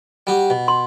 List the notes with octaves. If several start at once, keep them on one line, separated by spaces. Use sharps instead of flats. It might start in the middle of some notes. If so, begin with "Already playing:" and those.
G3 F#4 G4
B2
C6